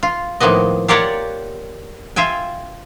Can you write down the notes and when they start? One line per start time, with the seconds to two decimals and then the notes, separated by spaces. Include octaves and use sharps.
0.03 F4
0.40 A2 D#3 F3 A#3 B3 D#5
0.88 F4 G4 A#4 C#5 D5 F#5
2.16 F4 E5 G5 G#5